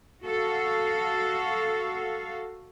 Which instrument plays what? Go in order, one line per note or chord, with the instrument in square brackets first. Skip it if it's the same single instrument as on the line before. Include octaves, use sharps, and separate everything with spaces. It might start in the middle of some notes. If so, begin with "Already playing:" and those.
[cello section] F#4 A4 F5